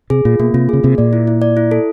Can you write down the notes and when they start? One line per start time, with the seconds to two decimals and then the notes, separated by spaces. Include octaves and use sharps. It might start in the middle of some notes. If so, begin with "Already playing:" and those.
0.10 C3 G#4
0.25 A#2 F4
0.39 B2 A#3
0.54 C3 F4
0.69 C#3 G#4
0.84 C3 A#3
0.98 A#2 D5
1.13 E4
1.27 E4
1.42 D5
1.57 E4
1.71 A4